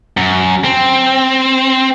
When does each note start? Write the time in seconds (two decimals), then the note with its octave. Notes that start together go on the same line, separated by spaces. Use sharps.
0.17 F#2
0.64 C4